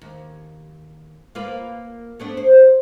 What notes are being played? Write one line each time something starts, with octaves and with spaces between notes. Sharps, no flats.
D#2
A#3 F4 B4
A3 B3 D4
C5